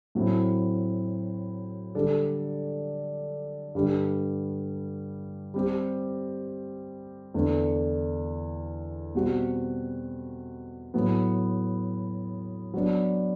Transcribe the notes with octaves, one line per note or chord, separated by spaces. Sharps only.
A2 F#3 C4 E4
D3 G3 D4 A4 D5
G2 D3 G3
G3 C4 G4
E2 D3 A3 D4
B2 G3 C4 F#4
A2 F#3 B3
F#3 B3 D4